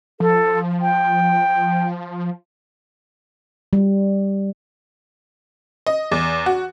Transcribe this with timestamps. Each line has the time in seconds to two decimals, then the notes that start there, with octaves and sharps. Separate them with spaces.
0.20 F3 A4
0.81 G5
3.73 G3
5.86 D#5
6.11 E2
6.46 F#4